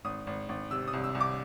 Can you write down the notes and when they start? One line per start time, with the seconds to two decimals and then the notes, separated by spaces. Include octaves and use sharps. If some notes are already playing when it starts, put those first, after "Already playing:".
0.05 G#1 D#6
0.27 G#1
0.49 G#1
0.71 C3 E6
0.88 D#6
0.93 C2
1.04 E6
1.15 C2
1.20 D6